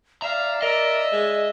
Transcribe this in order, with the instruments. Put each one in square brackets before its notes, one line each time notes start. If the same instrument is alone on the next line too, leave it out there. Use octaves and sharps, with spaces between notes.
[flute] D5 [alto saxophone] E5 [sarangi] F5 [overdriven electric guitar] A#5
[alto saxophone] A#4 [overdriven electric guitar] D#5 [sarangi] E5
[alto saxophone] G#3